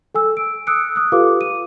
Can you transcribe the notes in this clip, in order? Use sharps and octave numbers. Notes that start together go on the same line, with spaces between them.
A4 G#5 E6
D7
D#6 E6 F#6 C#7 D7
D#6 F#6
F4 G4 A4 B4 F5 D6
D#7